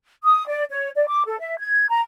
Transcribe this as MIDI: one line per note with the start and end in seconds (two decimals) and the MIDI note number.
0.24 0.46 87
0.48 0.63 74
0.70 0.90 73
0.96 1.05 74
1.08 1.23 86
1.27 1.40 69
1.40 1.55 76
1.59 1.87 92
1.89 2.00 82